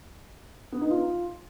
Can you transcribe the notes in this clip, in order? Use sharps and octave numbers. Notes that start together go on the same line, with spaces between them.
B3
D#4
F4